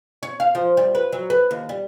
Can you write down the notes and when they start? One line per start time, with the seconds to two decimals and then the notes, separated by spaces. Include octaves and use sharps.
0.23 C#5
0.40 F5
0.55 F3
0.77 G3
0.95 B4
1.13 F#3
1.30 B4
1.51 D#2
1.69 G3